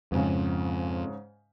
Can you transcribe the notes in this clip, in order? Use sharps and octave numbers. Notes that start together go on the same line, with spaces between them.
F2 G#2 C#3